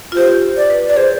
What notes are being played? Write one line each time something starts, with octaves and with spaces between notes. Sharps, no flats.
F4
G4 C5
D5
B4
D5
G#4 C5